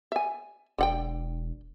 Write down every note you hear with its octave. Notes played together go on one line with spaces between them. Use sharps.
E5 G#5
E1 D3 F#5 G5